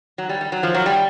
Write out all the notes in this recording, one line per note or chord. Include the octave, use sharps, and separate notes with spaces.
F#3
G3
G3
F#3
F3
F#3
G3